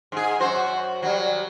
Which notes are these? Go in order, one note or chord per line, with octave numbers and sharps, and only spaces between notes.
G#2 G#4
F#2 F#4 C5
F#3 G3